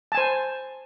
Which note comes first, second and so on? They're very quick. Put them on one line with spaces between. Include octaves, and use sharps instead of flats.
A5 G#5 C5